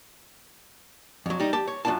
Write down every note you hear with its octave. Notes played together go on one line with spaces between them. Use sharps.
F2 F#3
G3 D#4
G4 A5
C#5
F#2 F3 D4 F4 A5